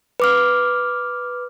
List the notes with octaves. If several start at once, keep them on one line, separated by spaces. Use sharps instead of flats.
B4 D6 F6